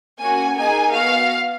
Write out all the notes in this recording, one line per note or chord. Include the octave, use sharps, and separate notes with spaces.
A#3 C#4 F#4 G#5
A#3 D#4 G#4 G#5
B3 F#4 F5